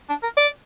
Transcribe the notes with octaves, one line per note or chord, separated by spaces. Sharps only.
D4
A#4
D5